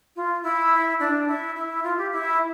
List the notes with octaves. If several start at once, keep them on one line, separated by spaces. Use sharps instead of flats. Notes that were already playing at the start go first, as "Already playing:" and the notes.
F4
E4
D4
E4
E4
F4
G4
E4